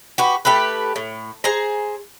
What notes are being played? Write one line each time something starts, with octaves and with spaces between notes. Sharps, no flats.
F#4 G4 B4
A3 G4 A4 B4
A2
G#4 C5 A#5